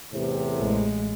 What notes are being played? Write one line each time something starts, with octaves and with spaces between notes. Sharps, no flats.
E2 A2 C3
A1 G#3